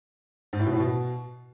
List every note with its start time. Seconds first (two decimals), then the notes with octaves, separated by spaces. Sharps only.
0.53 G#2
0.60 A2
0.66 B2
0.73 A2
0.80 B2